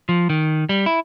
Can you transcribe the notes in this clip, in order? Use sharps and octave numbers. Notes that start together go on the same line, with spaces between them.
F3
D#3
G3
E4